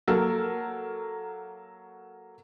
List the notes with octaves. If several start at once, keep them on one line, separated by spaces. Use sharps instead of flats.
F#3 A#3 A4 A#4